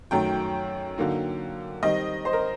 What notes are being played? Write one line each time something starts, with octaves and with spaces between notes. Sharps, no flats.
F#2 D#3 F#3 A3 G5
D3 F#3 A#3 D#4
D#3 G3 C4 D#5
C5
A#4